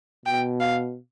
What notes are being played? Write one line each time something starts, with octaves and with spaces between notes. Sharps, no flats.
B2 G5
F5